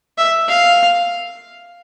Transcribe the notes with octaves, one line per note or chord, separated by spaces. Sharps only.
E5
F5